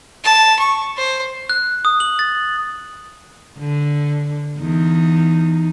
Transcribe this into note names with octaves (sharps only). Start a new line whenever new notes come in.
A5
C#6
C5
F#6
D#6
F#7
A6
D3
E2 D#4